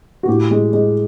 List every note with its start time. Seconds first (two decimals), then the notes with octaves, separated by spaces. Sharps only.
0.23 F#4
0.28 A2 G4
0.51 G#3
0.73 G#3